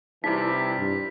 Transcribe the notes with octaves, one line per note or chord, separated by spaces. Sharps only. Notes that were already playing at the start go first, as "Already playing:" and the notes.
C3 E3 G3 D#4 E4 B6
G2